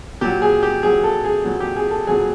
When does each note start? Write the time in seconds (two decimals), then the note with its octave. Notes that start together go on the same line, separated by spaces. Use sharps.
0.21 A#2 F#3 G4
0.42 G#4
0.63 G4
0.83 A#2 F#3 G#4
1.04 A4
1.24 G#4
1.45 A#2 F#3
1.60 G4
1.76 G#4
1.91 A4
2.07 A#2 F#3 G#4